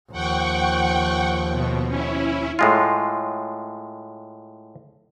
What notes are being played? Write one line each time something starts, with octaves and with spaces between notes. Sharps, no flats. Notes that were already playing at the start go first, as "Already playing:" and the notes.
D#2 F3 F#5 G5 C#6
B2
C#4 E4
A2 G#3 F4